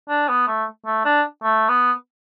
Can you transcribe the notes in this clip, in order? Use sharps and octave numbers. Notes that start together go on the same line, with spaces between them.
D4
B3
A3
A3
D4
A3
B3